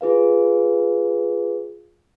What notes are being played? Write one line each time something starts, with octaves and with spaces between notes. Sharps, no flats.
F4 G#4 B4 F5